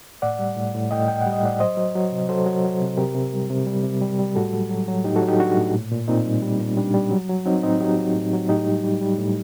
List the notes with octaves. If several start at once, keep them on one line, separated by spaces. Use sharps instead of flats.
A2 D5 F#5
G3
A2
A2
A2 D#5 G5
A2 G5
G3 F#5
D#5
A2 D5 F#5
F#3 C5 D#5
F#3
F#3
C3
F#3 A4 C5
F#3
F#3
C3
C3 G4 A#4
C3
G3
C3
G3
C3
G3
G3
A2 F#4 A4
F#3
F#3
F#3
A2 D#4 G4
F#4 A4
F#3
D#4 G4
F#3 D4 F#4
A2
A#2
A#2
A#2 C4 D#4
G3
G3
A#2
G3 D4
G3
F#3
F#3
F#3 C4 D#4
A2 C4 D#4
F#3 D#4 G4
F#3
A2
F#3
A2 D#4 G4
G3
G3
G3
A2